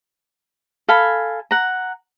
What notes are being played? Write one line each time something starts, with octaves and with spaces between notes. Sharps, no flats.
A4 F5 G#5 B5
F#5 A#5